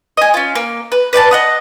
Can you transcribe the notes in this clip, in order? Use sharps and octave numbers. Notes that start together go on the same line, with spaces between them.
D#5 G#5
C#4 F4
A#3
B4
B4 D5 G5 A5
D#5 F#5 D#6